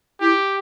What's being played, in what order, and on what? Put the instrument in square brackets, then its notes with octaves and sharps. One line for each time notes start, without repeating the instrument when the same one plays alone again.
[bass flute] E4 [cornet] G4